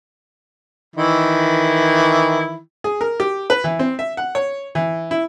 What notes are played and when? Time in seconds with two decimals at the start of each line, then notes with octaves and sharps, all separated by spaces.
0.96 D#3 E3 E4
2.84 G#4
3.01 A#4
3.20 G4
3.50 B4
3.64 E3
3.79 C4
3.99 E5
4.17 F#5
4.35 C#5
4.75 E3
5.11 E4